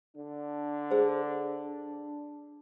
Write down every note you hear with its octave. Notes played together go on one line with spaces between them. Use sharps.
D3 D4
G#4 C5